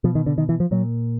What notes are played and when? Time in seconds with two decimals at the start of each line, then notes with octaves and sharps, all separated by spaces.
0.04 B2 F3
0.15 D#3
0.26 D3
0.38 D#3
0.49 E3
0.60 F3
0.71 A#2 F#3